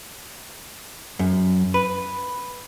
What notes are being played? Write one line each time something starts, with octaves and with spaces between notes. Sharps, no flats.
F#2
B4